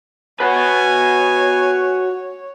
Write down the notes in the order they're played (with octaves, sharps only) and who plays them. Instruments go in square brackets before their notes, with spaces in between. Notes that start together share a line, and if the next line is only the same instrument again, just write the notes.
[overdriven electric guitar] F#4 B4 [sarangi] C#5 [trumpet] G#5